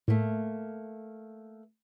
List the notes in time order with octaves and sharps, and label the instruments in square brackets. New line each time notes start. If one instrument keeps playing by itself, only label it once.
[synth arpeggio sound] A2 [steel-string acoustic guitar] A3 A#3